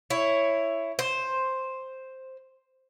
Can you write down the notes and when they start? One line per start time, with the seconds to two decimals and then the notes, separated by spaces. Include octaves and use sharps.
0.10 E4 C#5
0.99 C5